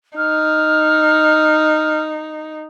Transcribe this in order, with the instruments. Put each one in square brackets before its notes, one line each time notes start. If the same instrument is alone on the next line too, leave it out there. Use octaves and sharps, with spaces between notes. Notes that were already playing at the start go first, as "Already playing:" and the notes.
[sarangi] D#4 [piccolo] F6